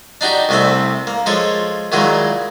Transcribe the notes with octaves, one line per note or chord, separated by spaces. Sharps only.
D4 D#4 F#4 G4
C2 C3 A3 C4 B5
A#3
F3 G#3 A4 C#5
A#2 D#3 F#3 G#3 E4